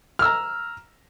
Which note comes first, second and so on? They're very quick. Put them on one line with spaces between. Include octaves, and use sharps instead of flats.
F6 E6 A#5